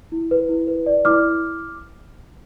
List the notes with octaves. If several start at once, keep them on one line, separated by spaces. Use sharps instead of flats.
E4
B4
E4
B4
D5
E4 D6 F6